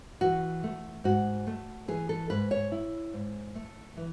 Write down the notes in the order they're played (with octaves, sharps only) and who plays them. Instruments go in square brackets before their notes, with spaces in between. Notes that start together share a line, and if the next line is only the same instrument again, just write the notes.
[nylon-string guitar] E3 F#4
A3
G#2 F#4
A3
E3 G#4
A4
G#2 B4
C#5
E4
G#2
A3
E3